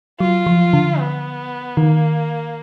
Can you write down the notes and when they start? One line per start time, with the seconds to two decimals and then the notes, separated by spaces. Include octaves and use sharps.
0.20 F#3 F4
0.47 F3
0.73 D3
0.99 B3
1.77 D#3 A#3